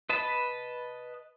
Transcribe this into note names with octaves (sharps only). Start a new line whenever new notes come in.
B4 D#5 A5 B5